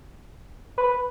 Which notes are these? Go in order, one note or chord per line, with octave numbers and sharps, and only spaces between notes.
B4